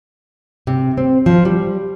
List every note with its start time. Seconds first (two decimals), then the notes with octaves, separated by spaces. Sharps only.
0.67 C3
0.98 C4
1.26 F3
1.45 G3